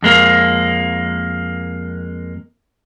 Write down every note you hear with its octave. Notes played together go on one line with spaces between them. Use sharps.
F2 G#3 A#3